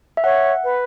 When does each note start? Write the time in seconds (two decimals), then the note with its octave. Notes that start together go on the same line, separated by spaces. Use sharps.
0.17 E5
0.24 C#5 F#5
0.64 B4